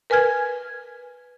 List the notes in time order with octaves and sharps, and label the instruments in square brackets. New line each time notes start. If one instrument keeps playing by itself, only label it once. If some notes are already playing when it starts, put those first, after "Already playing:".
[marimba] A#4 B4 G#5 F6 G#6